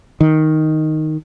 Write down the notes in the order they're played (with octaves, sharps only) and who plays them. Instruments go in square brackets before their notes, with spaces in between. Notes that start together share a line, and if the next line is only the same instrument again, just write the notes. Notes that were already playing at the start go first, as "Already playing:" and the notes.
[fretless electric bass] D#3